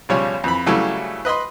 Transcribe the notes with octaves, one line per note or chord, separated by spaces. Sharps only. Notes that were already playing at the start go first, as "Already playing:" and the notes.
B1 C#3 F3 G3 C#5
F2 E3 B5
C#3 E3 F#3 G3 A3 E4
B4 D#5 B5 C6